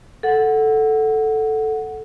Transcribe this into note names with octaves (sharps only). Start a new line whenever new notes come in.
A4 F#5